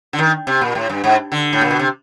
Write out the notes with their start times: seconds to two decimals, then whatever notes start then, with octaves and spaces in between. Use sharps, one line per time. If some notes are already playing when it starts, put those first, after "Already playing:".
0.13 D3
0.19 D#3
0.47 C3
0.61 A#2
0.75 A2
0.89 G2
1.04 G#2
1.32 D3
1.53 A2
1.61 A#2
1.71 B2
1.79 C3